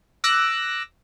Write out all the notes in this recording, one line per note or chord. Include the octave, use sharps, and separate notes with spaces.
D6 E6 F#6 A#6